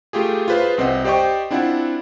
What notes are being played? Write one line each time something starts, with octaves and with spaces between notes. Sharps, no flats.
A3 F4 G4 G#4
F4 G#4 B4 C5 F5
C2 C4 D#5 F#5
G4 C5 D5 D#5 G5 C#6
C4 D4 E4 F4 F#5